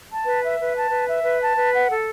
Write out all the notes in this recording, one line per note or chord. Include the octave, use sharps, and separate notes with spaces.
A5
B4
E5
B4
A5
B4
E5
B4
A5
B4
F#5
A4